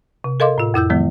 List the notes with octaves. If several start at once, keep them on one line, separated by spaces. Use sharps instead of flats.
C3
A4 A#4 D#5 F5 C6 D6
A2 F4
F2 E4 E6 G6
D#3 F3 F#3 G#3 B3